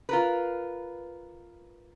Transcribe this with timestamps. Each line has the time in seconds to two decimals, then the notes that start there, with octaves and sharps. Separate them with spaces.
0.09 F4 A#4 B4